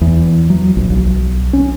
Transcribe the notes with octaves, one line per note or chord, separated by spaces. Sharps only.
E2
F#3
A#1
B1
C#4